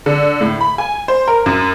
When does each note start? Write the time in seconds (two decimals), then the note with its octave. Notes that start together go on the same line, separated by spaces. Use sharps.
0.06 D3
0.41 A2
0.61 B5
0.78 G#5
1.08 C5
1.28 A#4
1.46 F#2